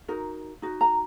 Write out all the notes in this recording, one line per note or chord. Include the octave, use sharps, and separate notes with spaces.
D#4 F#4 A#4
D#4 F#4
A#5